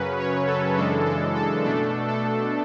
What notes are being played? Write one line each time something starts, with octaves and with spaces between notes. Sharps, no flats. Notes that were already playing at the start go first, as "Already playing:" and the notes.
Already playing: F#2 C#3 F#3 C#4 B4
C#5
A4
F#2 C#3 E3 G#3 D4 A4
A4
A4
B2 A3 D4 A4
A4